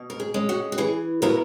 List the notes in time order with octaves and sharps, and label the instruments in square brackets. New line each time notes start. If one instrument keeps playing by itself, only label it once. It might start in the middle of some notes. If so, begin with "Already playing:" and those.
Already playing: [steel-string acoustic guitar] B2
A#4
G#4
G#3 C#4
F#4
F#4
E3 G#4
B3 E4 F#4 A#4